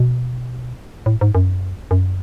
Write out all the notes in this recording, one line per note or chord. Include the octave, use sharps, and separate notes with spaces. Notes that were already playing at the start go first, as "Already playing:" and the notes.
Already playing: B2
A2
G#2
F#2
F#2